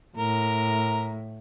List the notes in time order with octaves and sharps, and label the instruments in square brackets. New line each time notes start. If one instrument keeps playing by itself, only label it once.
[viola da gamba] A2 [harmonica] A#4